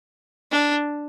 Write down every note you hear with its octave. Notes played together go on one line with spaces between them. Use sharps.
D4